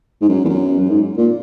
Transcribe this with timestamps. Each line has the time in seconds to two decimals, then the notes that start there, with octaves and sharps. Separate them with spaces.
0.22 G#2
0.29 F#2
0.45 E2
0.49 F#2
0.80 F#2
0.90 G#2
1.17 A#2